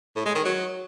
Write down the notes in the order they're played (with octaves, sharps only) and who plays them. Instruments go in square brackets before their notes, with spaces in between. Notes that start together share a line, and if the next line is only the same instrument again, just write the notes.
[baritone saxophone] A2
G#3
D#3
F#3